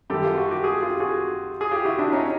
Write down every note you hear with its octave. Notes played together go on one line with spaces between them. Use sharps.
F#2 D#3 G3 G4 A4
F4
F#4
G4
F#4 G#4
F4 G4
F#4 G#4
G#4
F4 G4
E4 F#4
D4 E4
C#4 D#4